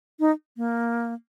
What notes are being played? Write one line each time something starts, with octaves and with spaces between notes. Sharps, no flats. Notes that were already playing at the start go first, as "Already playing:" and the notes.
D#4
A#3